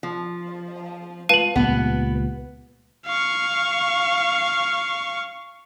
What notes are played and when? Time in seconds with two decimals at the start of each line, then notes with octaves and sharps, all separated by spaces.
0.03 F3
1.29 F4 B4 F5 A5 D#7 F#7
1.56 C#2 A#2 G3 B3
3.07 F5 C#6